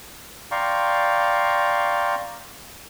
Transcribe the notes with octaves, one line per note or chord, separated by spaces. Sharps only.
D5 F5 G5 A#5 C6 C#6